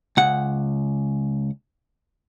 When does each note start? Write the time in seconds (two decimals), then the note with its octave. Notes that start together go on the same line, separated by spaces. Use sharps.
0.17 C#2 F#5